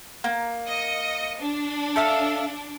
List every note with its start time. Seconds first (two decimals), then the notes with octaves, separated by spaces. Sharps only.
0.24 A#3
0.67 D#5 C#7
1.40 D4
1.96 A4 E5 F5